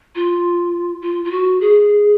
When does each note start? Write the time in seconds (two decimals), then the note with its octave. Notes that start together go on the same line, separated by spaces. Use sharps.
0.15 F4
1.02 F4
1.25 F4
1.31 F#4
1.61 G#4